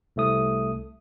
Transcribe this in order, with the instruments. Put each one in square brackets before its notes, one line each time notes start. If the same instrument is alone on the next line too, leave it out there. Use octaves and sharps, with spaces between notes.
[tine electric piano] C2 A3 D#6